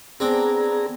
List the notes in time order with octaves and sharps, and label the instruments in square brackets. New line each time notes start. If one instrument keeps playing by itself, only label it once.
[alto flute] B3 [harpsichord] C4 D4 [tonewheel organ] G#4 A#5